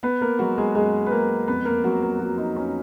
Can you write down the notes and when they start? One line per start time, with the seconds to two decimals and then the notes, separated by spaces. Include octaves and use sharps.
0.03 B3 B4
0.21 A#3 A#4
0.39 F#3 G#3 F#4
0.58 G#3 G#4
0.75 F#2 G#3 G#4
1.06 B4
1.11 G#3 A#3 A#4
1.48 F2 B3 B4
1.65 A#3 A#4
1.84 F2 F#3 F#4
2.02 A#3 A#4
2.20 F3 F#3 F#4
2.38 D#4
2.56 F2 C#4